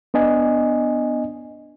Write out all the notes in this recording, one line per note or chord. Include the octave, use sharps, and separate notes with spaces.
B3 D4 D#5 G#5